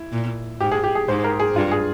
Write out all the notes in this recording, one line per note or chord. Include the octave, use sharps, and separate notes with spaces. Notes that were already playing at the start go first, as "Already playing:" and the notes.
Already playing: E4
A#2
G#2 G4
G#4
G4
G#4
G#2 C5
A#4
G#4
G2 F4
G#4